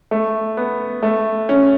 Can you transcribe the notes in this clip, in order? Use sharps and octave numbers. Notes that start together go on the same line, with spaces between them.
A3
B3
A3
C#4